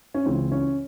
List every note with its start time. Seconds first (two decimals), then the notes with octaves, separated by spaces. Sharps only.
0.14 C#4
0.26 C#2 C#3 E3 C4
0.52 C#4